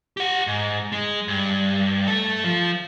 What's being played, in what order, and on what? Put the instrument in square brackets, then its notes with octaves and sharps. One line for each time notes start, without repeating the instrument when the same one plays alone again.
[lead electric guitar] G4 F#5
G#2
G#3
G2
A3 A4
F3